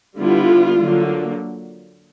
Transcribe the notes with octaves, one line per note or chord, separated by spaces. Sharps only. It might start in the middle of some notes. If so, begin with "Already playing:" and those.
D3 G3 B3 E4 F4
D3 F#3 A#3